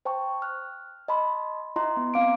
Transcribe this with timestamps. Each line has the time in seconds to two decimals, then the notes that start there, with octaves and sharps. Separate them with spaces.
0.05 C5 G5 A5 C#6
0.42 F6 F#6
1.08 D#5 A5 B5 C6
1.76 E4 D#5 A#5 C6
1.97 B3
2.14 C4 F5 D6 D7